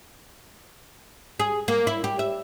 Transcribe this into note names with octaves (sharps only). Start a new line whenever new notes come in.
G#4
A#3
E4
G4
E5